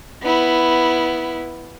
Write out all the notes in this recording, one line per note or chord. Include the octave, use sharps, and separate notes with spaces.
B3 E4